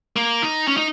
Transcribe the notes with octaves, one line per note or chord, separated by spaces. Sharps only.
A#3
D#4
C#4
D#4